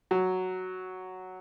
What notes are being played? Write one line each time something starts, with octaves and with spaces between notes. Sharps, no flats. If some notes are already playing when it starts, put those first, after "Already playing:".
F#3